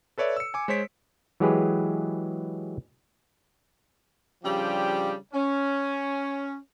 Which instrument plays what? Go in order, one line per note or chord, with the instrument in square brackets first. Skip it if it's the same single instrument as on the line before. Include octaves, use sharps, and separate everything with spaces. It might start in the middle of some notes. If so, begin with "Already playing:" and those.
[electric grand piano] A4 B4 C#5 D5 E5
E6 C#7
G#5 D6
G#3 C5 C#5 B6 D7
[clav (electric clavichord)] E3 F#3 G#3 G4 G#4 B4
[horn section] C#3 F3 G3 D4 G4 G5
C#4